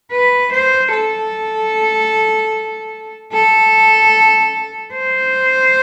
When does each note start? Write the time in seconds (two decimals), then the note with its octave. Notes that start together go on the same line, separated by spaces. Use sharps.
0.12 B4
0.52 C5
0.93 A4
3.33 A4
4.93 C5